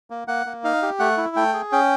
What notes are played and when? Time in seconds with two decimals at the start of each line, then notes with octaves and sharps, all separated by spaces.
0.10 A#3
0.28 A#3 F#5
0.46 A#3
0.64 D#4 F5
0.82 G4
0.99 A3 F#5
1.17 E4
1.36 A3 G5
1.54 G#4
1.72 C#4 G5